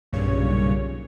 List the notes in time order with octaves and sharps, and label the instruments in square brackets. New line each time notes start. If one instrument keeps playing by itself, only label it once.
[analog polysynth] B1 G2 A#2 C#3 C#5